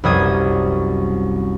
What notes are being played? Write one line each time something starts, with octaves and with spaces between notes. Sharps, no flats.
C2 F#2 G3 C4 D#6 G#6